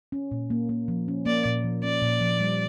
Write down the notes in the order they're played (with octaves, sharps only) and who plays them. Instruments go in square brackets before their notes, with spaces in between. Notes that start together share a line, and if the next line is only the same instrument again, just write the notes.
[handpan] C#4
A#2
A#3
A#3
F3
C#4
[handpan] A#3 [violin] D5
[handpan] A#2
F3
[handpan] C#4 [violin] D5
[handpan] A#2
F3
G3